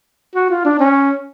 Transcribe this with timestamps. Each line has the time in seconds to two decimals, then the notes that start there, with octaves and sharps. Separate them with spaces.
0.35 F#4
0.50 F4
0.65 D4
0.79 C#4